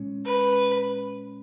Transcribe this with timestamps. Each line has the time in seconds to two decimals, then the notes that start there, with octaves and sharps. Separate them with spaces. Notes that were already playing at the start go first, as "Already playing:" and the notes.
Already playing: A#2 G#3 C#4
0.25 B4